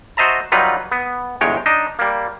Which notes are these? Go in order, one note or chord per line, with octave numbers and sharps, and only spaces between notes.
F#4 C5 D#5 E5 A5 A#5
F#3 G3 D#4 F4 B4
B3
G1 E2 G#3 C#5 G5
D4 D#4 D#5
G3 A#3